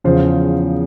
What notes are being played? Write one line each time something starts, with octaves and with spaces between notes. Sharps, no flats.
E2 C#3 F3 C5